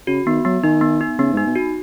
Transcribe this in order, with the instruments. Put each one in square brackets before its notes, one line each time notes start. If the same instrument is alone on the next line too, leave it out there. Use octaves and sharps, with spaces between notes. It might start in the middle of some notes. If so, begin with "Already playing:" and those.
[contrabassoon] C#3 [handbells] F#4
[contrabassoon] D#3 [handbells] B3
[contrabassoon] F#3 [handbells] B3
[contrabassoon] D#3 [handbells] D#4
[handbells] B3
D#4
[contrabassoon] C#3 [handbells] B3
[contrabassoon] G#2 [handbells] D#4
[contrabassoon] B2
[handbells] F#4